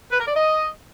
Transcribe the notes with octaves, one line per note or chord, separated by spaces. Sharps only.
B4
A#4
D5
D#5